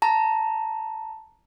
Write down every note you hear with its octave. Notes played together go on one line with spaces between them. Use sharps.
A5 A#5